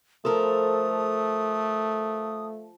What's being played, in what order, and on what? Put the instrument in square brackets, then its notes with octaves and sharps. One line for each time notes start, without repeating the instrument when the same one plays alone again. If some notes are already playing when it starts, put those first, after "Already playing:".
[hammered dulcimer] F3 [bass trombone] A3 [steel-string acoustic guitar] A4 A#4 [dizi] D#6